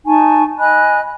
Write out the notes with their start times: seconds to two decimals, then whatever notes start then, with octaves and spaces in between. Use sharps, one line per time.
0.06 D#4 G#5 A5 C#6
0.59 D#5 G#5 B5 F#6